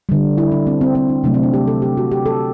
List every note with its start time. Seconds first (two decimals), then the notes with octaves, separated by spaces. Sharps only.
0.09 D3 G3
0.38 E4
0.52 D4
0.67 C4
0.81 C4
0.95 C4
1.09 D4
1.24 C3 F#3 A3 D4
1.34 C4
1.43 D4
1.54 G4
1.67 A4
1.82 G4
1.97 F#4
2.12 G4
2.26 A4